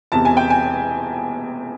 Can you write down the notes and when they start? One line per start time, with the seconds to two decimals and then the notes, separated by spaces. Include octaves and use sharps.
0.12 E1 E2 C3 A5
0.25 G#5
0.37 G5
0.50 G#5